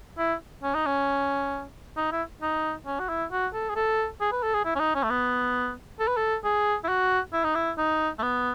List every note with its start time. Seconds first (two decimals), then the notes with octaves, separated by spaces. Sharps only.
0.18 E4
0.63 C#4
0.74 D#4
0.86 C#4
1.97 D#4
2.12 E4
2.42 D#4
2.86 C#4
3.00 F#4
3.09 E4
3.32 F#4
3.54 A4
3.69 G#4
3.76 A4
4.21 G#4
4.32 B4
4.43 A4
4.54 G#4
4.65 E4
4.76 C#4
4.80 D#4
4.95 C#4
5.03 A3
5.10 B3
6.00 A4
6.08 B4
6.17 A4
6.44 G#4
6.84 E4
6.89 F#4
7.33 E4
7.44 D#4
7.55 E4
7.78 D#4
8.19 A3
8.23 B3